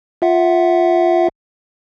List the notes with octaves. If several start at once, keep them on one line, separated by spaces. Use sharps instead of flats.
F4 E5 F#5